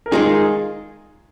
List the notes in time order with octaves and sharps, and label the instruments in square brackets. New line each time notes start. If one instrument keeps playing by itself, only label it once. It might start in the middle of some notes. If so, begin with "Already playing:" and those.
[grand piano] A#4
[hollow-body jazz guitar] D#3 G#3 D#4 [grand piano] F4 G#4